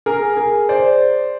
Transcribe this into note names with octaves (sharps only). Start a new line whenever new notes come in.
G#4 A#4
G#4
C5 D5